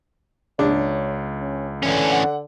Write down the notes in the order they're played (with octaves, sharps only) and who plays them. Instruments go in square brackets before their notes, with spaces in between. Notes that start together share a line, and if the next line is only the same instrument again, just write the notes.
[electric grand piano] C#2 [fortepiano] D4 [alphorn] C#5
[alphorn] C#4
[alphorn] D3 [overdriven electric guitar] E3 C#4
[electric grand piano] F#5